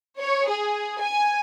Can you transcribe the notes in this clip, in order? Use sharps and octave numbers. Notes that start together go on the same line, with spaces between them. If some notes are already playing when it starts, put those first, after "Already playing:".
C#5
G#4
G#5